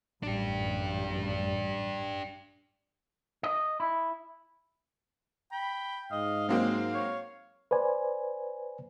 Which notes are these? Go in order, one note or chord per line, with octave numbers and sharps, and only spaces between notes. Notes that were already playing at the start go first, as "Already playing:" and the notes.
A1 F#2 G3 D4 G4
D#5
E4
G5 B5
G#2 D#5 F5
F#3 G#3 A#3 C4
C#5
B4 C5 D5 G#5